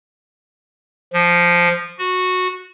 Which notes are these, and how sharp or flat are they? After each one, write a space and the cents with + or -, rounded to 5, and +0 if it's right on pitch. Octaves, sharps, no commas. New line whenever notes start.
F3 -5
F#4 -10